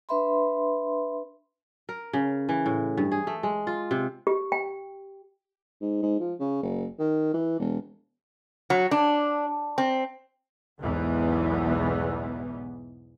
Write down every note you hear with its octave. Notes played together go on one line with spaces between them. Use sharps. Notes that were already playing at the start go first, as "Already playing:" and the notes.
D4 B4 E5 B5 C6
A#4
C#3
E3
A2
G2
G#4
A3
G#3
F4
C3
G4
G5
G#2
G#2
F3
C#3
F#1
D#3
E3
E1
F#3
D4
C4
B1 E2 G#2 E3 B3